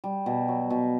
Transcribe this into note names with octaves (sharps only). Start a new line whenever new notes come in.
G3
B2
F#3
B2